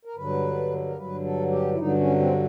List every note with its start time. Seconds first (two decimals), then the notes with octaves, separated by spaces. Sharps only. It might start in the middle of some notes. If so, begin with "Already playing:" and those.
0.05 A#4
0.16 G2 D3 F#3 B4
0.86 A#4
0.97 G2 D3 F#3 B4
1.25 A4
1.51 G4
1.74 E4
1.78 G2 D3 F#3 D#4
1.99 C#4
2.19 C4